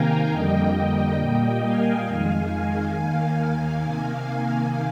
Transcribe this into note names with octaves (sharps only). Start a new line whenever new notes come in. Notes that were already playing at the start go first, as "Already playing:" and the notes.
Already playing: C3 D#3 A#3 F5 G5 G#5 A#5
F2 D3 G3 A#3 D#5 G5
D#5 G5
A#2 G3 A#3 D#5 G5
F5 G#5
F2 D#3 G#3
F5 G#5
D#2 D#3 A#3 F5 G#5
C3 D#3 A#3